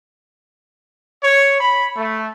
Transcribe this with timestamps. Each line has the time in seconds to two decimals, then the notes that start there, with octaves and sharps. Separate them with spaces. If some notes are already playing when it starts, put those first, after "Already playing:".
1.22 C#5
1.61 B5
1.97 A3